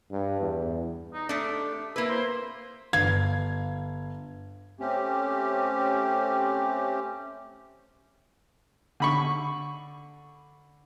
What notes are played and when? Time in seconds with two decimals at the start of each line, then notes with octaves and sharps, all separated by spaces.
0.11 G2
0.40 E2
1.14 D#4
1.29 A3 D4 G4
1.96 A#3 E4 B4
2.10 C5
2.93 G1 F5 G#6
4.80 A3 C4 C#4 G4
9.00 D3 B5 C#6